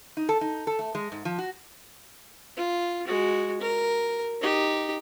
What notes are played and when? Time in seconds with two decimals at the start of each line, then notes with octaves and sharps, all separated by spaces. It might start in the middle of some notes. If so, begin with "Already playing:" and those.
0.17 D#4
0.29 A4
0.41 D#4
0.67 A4
0.79 A3
0.95 G#3
1.12 G#2
1.25 F3
1.38 F#4
2.57 F4
3.07 G#3 F#4
3.61 A#4
4.41 D#4 G4